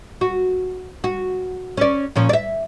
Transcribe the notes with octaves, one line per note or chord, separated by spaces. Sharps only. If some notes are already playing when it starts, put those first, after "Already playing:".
F#4
F#4
C#4 D5
A#2 F3 C#4
D5 E5